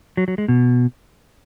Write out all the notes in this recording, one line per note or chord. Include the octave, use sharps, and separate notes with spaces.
F#3
F#3
G#3
B2